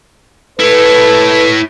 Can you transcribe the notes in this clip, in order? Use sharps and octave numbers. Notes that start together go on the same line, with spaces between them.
E4 A4 B4 C#5